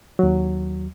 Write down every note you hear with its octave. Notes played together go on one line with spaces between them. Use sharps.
D#2 F#3